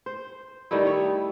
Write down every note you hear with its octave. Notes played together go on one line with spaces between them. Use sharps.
C5
D#3 G3 A3 E4
E4 C#5